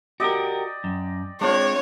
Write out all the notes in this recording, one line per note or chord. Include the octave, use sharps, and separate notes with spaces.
F#4 G4 A#4 D5 D#5 G5
F#2
G#3 C4 D4 F4 C5 C#5